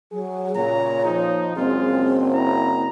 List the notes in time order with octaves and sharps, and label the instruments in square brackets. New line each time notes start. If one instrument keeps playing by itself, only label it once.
[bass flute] F#3 [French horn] G#4
[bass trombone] A#2 [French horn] C#3 [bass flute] C#5 [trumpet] A#5
[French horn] F3 [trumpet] D#4
[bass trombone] F#1 [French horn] G#3 [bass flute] C4 [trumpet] F4
[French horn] E4 [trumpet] A#5